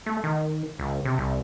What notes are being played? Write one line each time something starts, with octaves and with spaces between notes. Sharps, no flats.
A3
D#3
C#2
C3
C2